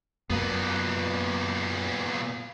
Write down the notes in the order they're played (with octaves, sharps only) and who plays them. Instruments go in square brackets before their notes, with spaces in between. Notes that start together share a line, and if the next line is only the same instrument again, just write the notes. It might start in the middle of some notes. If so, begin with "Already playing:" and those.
[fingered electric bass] F#2 A#3 [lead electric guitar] A#2 B3